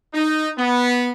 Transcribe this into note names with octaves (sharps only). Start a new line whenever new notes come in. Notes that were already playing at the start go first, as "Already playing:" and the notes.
D#4
B3